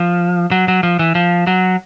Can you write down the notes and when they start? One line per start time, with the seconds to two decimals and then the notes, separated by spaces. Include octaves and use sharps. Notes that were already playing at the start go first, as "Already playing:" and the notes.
Already playing: F3
0.51 F#3
0.68 F#3
0.83 F3
0.99 E3
1.15 F3
1.47 F#3